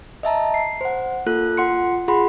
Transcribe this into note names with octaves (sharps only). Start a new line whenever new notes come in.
D#5 E5 A5 A#5
C7
C5 F#5
A#3 F4 A4 F#6
F4 F#5 C6 C#7
F4 G#4 F#5 B5 C6